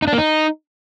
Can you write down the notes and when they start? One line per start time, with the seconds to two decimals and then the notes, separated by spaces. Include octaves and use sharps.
0.02 D#4
0.08 D4
0.13 A#3
0.18 D#4